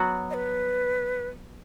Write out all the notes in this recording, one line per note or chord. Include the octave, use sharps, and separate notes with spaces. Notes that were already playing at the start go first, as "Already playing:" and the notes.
Already playing: F#3 B3 F#4
D#5
B4